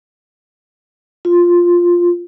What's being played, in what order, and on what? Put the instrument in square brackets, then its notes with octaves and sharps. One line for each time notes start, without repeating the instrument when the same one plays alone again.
[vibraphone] F4